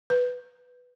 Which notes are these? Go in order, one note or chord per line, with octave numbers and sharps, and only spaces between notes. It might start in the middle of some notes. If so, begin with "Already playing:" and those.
B4